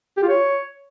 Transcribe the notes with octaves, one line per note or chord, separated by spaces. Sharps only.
G4
F4
C#5